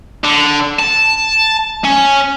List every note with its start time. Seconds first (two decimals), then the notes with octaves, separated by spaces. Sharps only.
0.24 D3
0.79 A5
1.84 C#4